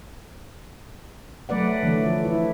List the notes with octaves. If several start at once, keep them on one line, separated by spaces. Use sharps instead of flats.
F#3 A3 B4 D5 F#5
D3 E3 A3
F3
E4